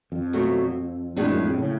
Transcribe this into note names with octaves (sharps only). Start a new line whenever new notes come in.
F2
B2 F#3 A3
F2 A2 G#3 D4
F#2
F2
A2 C#3